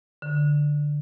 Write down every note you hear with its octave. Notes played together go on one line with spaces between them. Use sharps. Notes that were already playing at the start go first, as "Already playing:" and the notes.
D3